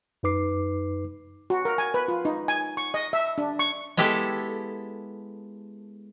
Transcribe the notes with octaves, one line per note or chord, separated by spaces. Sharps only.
F#2 D#4 B4 D6 C7
F#4
A#4
G#5
B4
F4
D#4
G#5
C#6
D#5
E5
D4
C#6
G#3 B3 E4 G4 A4